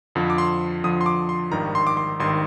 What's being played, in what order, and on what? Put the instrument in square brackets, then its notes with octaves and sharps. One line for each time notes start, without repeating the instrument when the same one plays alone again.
[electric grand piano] F2 D3 F3
D6
C6
F2 D3 F3 D#6
C6
D6
C6
G#1 G2 D#3 A#5
C6
D6
C6
G#1 G2 D#3 C6